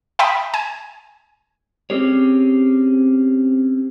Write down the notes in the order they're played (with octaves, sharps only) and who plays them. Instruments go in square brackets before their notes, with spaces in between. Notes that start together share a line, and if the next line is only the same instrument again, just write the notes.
[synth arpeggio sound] E5 G5 A#5 B5 D#6
G#5
[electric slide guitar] C4 C#4 G4 G#4 C#5